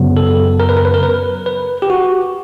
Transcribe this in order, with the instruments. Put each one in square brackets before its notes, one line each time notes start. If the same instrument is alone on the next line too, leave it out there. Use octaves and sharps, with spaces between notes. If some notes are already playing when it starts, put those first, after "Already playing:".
Already playing: [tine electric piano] F#2 C#3 F#3 B3
A4
A#4
B4
A#4
B4
A#4
B4
B4
G4
F#4